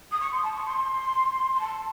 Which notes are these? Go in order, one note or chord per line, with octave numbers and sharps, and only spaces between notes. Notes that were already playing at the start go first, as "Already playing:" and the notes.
D#6
C#6
C6
A5
C#6
C6
C6
A5